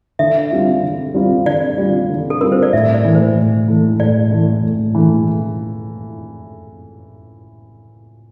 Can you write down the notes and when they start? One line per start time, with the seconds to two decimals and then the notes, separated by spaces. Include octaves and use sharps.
0.19 D3 E5
0.51 G3 C4 F4
0.83 D3
1.14 G3 C4 F4
1.46 D3 D5
1.78 G3 C4 F4
2.10 D3
2.30 A4
2.41 G3 C4 F4 A#4
2.52 C5
2.63 D5
2.73 A2 E5
2.94 D5
3.05 E3 A3
3.15 C5
3.37 A2
3.68 E3 A3
4.00 A2 D5
4.31 E3 A3
4.63 A2
4.95 E3 A3